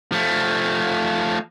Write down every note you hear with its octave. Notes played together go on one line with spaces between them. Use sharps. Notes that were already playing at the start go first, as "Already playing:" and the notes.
F3 A3